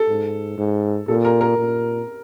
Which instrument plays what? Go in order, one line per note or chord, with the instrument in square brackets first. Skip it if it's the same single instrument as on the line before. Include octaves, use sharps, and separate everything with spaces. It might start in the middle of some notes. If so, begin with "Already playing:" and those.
Already playing: [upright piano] A4
[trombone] G#2
G#2
[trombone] A#2 [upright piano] A4
[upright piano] A#4
A#4
[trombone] A#2